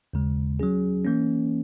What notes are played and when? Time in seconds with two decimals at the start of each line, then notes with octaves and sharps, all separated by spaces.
0.13 D#2 C#3 G#3
0.60 F#3 C#4 G#4
1.05 E3 A#3 C#4